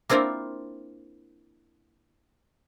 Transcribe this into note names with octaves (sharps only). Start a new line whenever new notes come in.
A#3 C4 D4 E4 F4 A#4